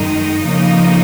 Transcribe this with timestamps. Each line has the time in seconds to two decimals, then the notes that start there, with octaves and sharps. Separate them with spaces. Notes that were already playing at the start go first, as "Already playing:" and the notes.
Already playing: F#2 D#3 G#3 D#4
0.43 F2 C#3 F3 A#3 D#4